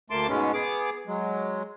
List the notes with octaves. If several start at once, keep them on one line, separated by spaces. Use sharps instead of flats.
D2 A3 A#3 A5 C6 D6
G#2 B2 G#3 B3 C#4
B3 G#4 D6
F#3 G#3